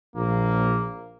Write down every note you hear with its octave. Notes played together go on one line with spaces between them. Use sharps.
A#1 A#3